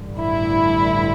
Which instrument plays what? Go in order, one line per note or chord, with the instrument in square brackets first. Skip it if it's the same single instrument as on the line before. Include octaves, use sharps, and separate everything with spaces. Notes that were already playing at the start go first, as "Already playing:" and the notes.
Already playing: [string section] A1 G2 D3
E4